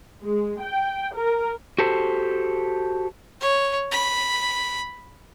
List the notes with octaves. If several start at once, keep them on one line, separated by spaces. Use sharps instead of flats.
G#3
G5
A#4
F#4 G4 A4 C5
C#5
B5